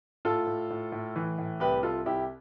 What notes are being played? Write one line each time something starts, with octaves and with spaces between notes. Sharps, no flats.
A2 F4 A4
A2
A2
A2
E3
A2
C2 G4 B4
C2 F4 A4
C2 E4 G4